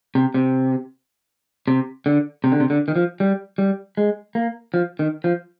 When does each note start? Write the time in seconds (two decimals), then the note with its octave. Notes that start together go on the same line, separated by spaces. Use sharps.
0.15 C3
0.34 C3
1.68 C3
2.06 D3
2.44 C3
2.52 D3
2.60 C3
2.70 D3
2.88 D#3
2.96 F3
3.20 G3
3.58 G3
3.97 G#3
4.35 A#3
4.74 F3
4.99 D#3
5.24 F3